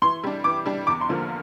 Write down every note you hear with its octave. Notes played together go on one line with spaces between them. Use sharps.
E3 C6
G3 D4
E3 D6
G3 D4
E2 D6
C6
D3 F3 A#3 F4